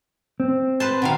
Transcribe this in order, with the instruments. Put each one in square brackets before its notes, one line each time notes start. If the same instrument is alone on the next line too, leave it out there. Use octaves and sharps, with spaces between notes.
[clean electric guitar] C4
[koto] B4 C5 A5
B2 D#3 F5